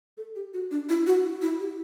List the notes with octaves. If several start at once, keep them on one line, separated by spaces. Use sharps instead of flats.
A4
G4
F#4
D4
E4
F#4
E4
G4